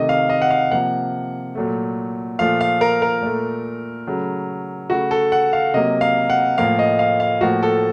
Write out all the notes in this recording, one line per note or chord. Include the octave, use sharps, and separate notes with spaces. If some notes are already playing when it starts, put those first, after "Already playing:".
Already playing: C3 D#3 A3 D#5
F5
D#5
F#5
F5
C3 F3 A#3 F#5
A#2 F#3 A3
A#2 F3 A3 F5
F5
A#4
A#4
A#2 A3
C#3 F#3 A3
C#3 A3 F#4
A4
F#5
F5
C3 F#3 A#3 D#5
F5
F#5
A2 F3 A#3 F5
D#5
F5
F5
A2 F3 A#3 F#4
A4